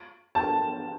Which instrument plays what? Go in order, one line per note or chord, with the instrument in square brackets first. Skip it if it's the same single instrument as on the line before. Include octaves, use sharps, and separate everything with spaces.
[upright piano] A5